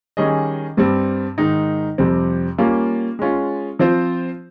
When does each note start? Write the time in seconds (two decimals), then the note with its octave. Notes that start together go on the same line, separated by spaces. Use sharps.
0.17 D#3 G3 C#4 G#4 D#5
0.77 G2 G3 C4
1.38 G#2 D#3 G#3 D#4
1.98 F2 C3 G3 C4
2.58 G3 A#3 C#4 F4
3.19 G#3 C#4 F4
3.79 F3 C4 F4 C5